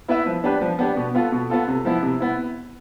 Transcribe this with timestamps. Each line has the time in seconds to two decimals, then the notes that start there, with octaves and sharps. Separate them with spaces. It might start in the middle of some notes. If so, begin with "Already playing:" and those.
0.08 B3 E4 B4 E5
0.26 F3
0.44 B3 D4 G4 B4
0.61 F3
0.79 B3 D4 G4 B4
0.96 B2
1.15 B3 F4 A4
1.32 B2
1.50 B3 F4 A4
1.68 C3
1.85 F3 B3 E4
2.03 C3
2.20 B3 E4